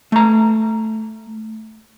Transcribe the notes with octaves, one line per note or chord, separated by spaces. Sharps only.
A3 A#5